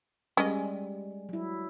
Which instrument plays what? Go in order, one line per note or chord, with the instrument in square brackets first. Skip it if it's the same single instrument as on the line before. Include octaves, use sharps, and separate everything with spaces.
[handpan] G3 G#3 [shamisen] C#4 D#5
[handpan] F#3 E4